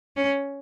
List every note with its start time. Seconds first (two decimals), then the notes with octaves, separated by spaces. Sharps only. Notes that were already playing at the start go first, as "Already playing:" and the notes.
0.16 C#4